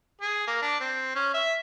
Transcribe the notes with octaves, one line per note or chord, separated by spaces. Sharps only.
G#4
A#3
D4
C4
C#4
E5